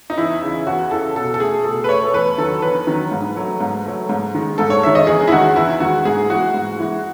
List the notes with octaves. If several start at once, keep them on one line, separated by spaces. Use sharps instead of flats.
D#4
E2 E4
C#3 E3
E2 F#4
C#3 E3 A4
B2 A4
A4
A3 G#4
B2 A4
B4
A3 C#5
A4
E2 B4
D#3 F#3 A4
E2 B4
D#3 F#3
G#2
F#3 A3
G#2
F#3 A3
G#2
D#3 G#3
G#2 A4
C#5
D#3 G#3 E5
D#5
E2 G#4
E4
D#3 G#3 F#4
E2 E4
D#3 G#3 F#4
G#2 G#4
E3 G#3 F#4
G#2
E3 G#3